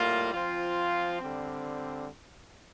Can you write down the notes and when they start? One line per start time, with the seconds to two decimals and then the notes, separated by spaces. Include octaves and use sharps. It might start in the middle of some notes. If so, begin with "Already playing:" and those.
Already playing: A2 G3 A#3 F4
0.33 F3 C4 F4
1.20 D3 G3 C4